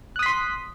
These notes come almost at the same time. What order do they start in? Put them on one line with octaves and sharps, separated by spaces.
F#6 D#6 B6 C6